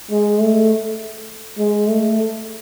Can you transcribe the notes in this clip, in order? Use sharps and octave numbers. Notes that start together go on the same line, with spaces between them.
G#3
A3
G#3
A3